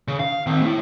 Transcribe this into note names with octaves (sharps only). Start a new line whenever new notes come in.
C#3
F5
D#3 C4
A3 E4